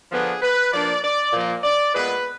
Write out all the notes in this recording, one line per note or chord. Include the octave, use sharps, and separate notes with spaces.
D3 F3 B3 D4 G#4
B4
F3 A#3 D4 D5
D5
A#2 F3 A#3
D5
A#2 G#3 B3 B4